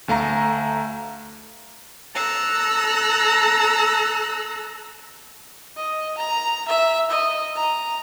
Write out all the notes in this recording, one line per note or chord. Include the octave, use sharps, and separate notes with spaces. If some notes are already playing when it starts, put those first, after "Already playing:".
D2 A3 F5 A#5
A4 A#5 E6 F#6
D#5
A#5
E5
D#5
A#5